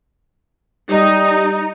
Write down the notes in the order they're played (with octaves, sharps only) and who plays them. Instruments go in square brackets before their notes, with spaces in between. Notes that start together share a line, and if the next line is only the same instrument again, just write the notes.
[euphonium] G3 [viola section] D#4